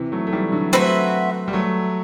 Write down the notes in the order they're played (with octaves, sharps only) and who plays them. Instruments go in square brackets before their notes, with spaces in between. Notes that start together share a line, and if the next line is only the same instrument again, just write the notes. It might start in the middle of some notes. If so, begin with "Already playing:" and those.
Already playing: [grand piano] C3 E3
F#3 A3
A3
E3 G3
D3 F#3
[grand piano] F#3 A3 [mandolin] C4 F#4 B4 E5
[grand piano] G3
F#3 A3